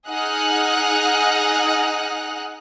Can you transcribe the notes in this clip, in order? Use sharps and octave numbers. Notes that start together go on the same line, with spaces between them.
D#4 G#4 D#5 F#5 F6 F#6